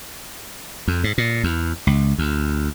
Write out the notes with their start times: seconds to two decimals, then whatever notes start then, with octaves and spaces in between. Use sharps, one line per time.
0.88 F2
1.04 G#2
1.18 A#2
1.44 E2
1.87 C#2
2.18 D2